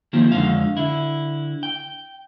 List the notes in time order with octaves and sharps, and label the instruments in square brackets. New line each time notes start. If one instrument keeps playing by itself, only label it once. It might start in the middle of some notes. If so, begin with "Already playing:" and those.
[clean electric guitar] D#3 F3 A#3 C4
F2 D3 F3 G#3 F5
D3 E4
G5